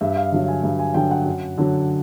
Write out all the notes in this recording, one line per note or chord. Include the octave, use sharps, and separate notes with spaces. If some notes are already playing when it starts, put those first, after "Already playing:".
G2 E5
F5
D3 F#3
G#5
G2
G#5
D3 F#3 G5
F#5
F#2
D3 F#3